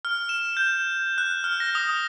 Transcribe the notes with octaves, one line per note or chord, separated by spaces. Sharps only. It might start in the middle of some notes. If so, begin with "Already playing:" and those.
F6
E7
G6
F#6
F6
A#6
D#6